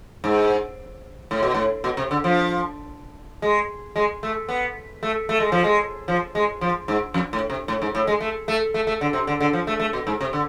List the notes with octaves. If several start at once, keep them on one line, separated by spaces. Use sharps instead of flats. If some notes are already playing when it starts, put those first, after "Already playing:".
G#2
A2
B2
A2
B2
C3
D3
F3
G#3
G#3
A3
B3
A3
A3
G#3
F3
G#3
F3
G#3
F3
G#2
F2
A2
C3
A2
G#2
A2
G#3
A3
A3
A3
A3
D3
C3
D3
D3
F3
A3
A3
B2
G#2
C3
D3